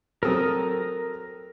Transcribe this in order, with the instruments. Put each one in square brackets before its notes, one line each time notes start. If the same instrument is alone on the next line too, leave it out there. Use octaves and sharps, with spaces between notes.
[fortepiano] F#3 C4 A4 [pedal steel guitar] A#4 D#6